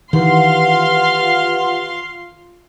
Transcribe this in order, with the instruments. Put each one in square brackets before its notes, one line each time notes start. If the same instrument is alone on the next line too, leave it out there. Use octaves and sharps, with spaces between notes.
[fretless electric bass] D#3 E3 [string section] F4 F5 C6 [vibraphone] G4 B4 F#5